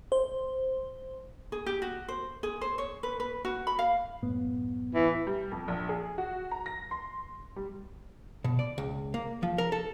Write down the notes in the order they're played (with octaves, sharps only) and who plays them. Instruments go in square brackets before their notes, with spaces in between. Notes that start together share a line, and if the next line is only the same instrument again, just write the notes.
[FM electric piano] C5
[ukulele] G#4
G4
F#4
C5
G#4
C5
C#5
B4
B4
F#4
B5
F5
[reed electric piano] F#2 A2 B3
[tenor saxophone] E3
[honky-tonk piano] G3
F2
A#1
G#4
F#4
A#5
A#6
C6
G3
[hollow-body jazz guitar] B2
D5
C#2
A#3
F3
A#4
A4